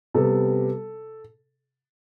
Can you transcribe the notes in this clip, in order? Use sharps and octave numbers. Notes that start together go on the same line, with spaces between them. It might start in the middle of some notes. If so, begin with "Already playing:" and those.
C3 G3 B3 A4